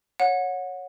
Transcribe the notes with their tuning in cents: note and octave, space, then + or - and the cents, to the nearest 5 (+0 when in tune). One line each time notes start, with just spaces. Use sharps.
C#5 +0 F#5 -25